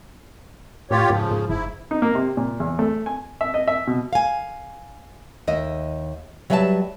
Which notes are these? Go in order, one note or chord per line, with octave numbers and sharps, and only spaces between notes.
A2 F4 G4 C#5
G#2 C#3 F3
G#2
F#1 G#2 E4
D#4
A#3
C3
A#2
E2
A3
G#5
E5
D#5
E5
B2
F5 G#5
D#2 D#5 E5
F#3 G3 B4 E5 G5 A5